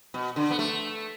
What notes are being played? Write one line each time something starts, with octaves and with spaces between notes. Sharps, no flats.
B2
D3
B3
A3